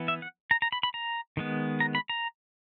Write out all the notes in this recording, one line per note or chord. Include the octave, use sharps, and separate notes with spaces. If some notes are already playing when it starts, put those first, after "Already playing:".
Already playing: E3 B3
E5
F#5
A#5
A#5
B5
B5
A#5
D#3 G#3 B3
A#5
B5
A#5